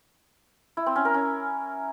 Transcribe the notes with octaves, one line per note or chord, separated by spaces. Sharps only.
E4
C4
C#4
A#4
C#4